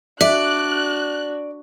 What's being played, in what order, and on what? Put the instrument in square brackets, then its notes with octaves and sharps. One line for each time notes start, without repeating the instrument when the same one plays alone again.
[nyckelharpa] D4 F#4 [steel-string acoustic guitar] D5 [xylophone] E5 [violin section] F#6